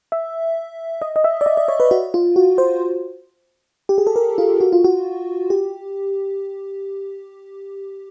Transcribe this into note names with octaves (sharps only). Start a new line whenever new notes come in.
E5
D#5
D#5
E5
D5
D#5
D5
C#5
B4
F#4
F4
F#4
C5
G4
G#4
A4
A#4
F4
F#4
F4
F#4
G4